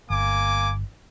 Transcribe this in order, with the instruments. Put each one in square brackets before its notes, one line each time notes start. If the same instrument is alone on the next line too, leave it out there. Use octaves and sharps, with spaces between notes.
[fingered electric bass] G1 [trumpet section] A#3 G#5 D6